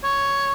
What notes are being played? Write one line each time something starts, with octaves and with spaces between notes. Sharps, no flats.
C#5